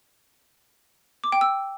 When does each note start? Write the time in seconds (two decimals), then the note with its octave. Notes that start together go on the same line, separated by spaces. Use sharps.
1.24 D6
1.32 G5
1.41 E6